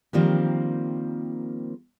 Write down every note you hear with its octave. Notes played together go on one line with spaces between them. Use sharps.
D#3 F3 G3 A#3 C4